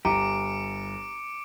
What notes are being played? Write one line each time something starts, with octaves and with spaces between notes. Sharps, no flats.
G1 G4 A#5 D6 C#7 D7